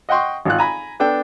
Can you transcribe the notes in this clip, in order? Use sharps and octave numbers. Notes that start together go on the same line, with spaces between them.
D#5 F#5 G5 C6 C#6
G#1 F4 F#6
G#5 A#5 B5
B3 D4 A4 G5